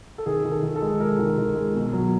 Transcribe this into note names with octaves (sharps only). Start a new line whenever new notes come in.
A4
D#3 G#4
D#3
A4
D#3
A4
G#3
G#3 A#4
D#3
D#3
G#3
B2
F#3